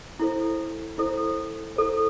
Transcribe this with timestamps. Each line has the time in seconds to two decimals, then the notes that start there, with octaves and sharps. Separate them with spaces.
0.20 E4 A4 C5
0.98 E4 A4 C5
1.76 E4 A4 C5